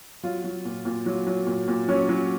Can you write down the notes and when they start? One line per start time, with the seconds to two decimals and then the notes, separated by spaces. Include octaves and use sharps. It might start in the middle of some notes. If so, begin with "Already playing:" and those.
0.23 F#3 F4
0.44 F#3
0.65 A#2
0.85 A#2
1.06 F#3
1.27 F#3
1.47 A#2
1.68 A#2
1.88 F#3 C#4
2.09 F#3